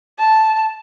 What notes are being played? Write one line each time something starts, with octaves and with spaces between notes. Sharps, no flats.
A5